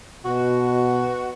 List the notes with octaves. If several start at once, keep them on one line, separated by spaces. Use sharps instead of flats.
B2 F#4